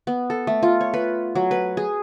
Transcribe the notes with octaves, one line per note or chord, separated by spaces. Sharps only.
B3
A4
A3
F4
C#5
B4
F#3
B4
G#4